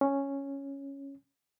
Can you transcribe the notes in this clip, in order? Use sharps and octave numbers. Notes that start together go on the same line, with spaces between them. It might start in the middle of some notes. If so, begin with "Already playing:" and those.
C#4